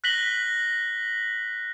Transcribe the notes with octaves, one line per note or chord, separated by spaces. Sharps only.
F#6 A#6 B6 F#7 G7